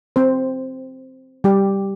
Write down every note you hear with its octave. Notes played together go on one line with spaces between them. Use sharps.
C4 C5
G3 G4